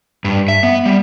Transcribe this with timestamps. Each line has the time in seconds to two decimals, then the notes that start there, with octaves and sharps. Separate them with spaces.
0.24 G2
0.48 E5
0.63 B3
0.85 G3